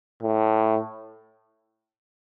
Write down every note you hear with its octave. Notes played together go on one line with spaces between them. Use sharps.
A2